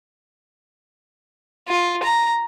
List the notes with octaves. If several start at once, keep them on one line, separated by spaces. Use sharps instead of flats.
F4
A#5